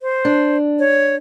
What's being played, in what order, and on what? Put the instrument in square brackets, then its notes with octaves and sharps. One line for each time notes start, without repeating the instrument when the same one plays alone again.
[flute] C5
[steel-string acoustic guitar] D4
[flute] C#5